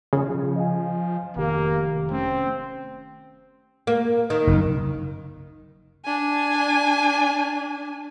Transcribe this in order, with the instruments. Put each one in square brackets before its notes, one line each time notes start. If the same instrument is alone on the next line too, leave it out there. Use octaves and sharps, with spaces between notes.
[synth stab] C#3 [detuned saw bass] F3
[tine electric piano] D#5 F5 G#5
[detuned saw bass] F1 [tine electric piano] C3 D#3 G4 [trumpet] A#3
[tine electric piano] A3 C#4 [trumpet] C4
[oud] A#3
D#3
[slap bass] F#1
[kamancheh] D4 G#5